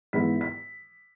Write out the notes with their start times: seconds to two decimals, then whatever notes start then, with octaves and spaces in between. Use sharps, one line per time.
0.13 G#2 E3 G#3 B3 E4 B6
0.41 B6